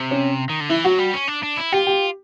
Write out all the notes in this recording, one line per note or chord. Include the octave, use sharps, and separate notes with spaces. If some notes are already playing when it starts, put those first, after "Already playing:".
Already playing: C3
C#4
D#3
D3
E3 E4
F#3 F#4
G3
C#4
D4
D4
E4
F4 G4
G4